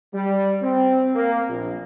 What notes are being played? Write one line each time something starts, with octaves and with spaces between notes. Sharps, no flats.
G3
C4
A#3
A#1